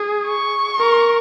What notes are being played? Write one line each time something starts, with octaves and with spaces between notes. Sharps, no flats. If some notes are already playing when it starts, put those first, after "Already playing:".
Already playing: G#4
C#6
A#4